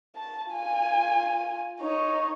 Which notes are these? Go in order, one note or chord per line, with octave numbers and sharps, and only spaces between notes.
A5
F4 G#5
D#4 C#5